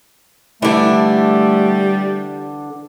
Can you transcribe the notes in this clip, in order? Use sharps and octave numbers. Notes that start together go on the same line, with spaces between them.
D3 E3 G3 A3 D4 E4